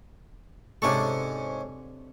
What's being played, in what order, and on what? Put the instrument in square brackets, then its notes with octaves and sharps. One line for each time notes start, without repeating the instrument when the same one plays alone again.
[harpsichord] G#2 C#4 C#6 [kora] C3 D4 A4